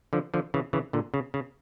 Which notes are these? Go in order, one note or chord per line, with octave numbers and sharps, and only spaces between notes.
D3 F3
D3 F3
C#3 E3
C#3 E3
A#2 D3
C#3
C#3